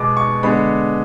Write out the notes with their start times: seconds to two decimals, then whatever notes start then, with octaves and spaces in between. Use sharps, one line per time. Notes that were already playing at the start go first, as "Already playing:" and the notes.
Already playing: B2 G#3 B3 D6
0.17 C#6
0.43 D3 G#3 B3 B5